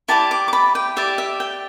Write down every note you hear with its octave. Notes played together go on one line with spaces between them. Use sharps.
E4 G4 D5 A5
D6
D6
B5
G5
G4 D5 E5
E5
G5